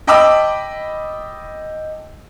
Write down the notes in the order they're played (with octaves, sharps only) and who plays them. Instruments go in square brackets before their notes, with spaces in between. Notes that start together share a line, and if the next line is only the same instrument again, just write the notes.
[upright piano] D#5 G5 A5 B5 D6 E6